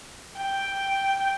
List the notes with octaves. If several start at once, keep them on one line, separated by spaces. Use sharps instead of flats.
G5